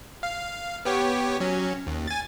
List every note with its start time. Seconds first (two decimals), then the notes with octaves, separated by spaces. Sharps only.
0.23 F5
0.85 B3 G4 C#5
1.40 F#3 C#4
1.87 D#2
2.08 G#5 A6